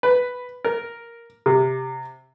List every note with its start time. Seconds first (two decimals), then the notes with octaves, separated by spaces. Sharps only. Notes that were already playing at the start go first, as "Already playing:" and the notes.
0.03 B4
0.64 A#4
1.46 C3